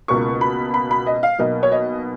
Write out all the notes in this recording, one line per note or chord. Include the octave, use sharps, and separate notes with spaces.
C#2 B2 A#3 C#6
B5
B5
B5
D#5
F5
B1 B2 A#3 D#5
C#5
D#5